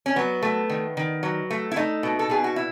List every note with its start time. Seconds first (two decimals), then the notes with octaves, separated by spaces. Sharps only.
0.06 C#4
0.16 F#3 B3
0.43 A3
0.69 D#3
0.97 D#3
1.23 F#3
1.50 A3
1.71 E4
1.76 A3 D#4
2.03 B2
2.19 A4
2.30 B2 G#4
2.44 F#4
2.56 E4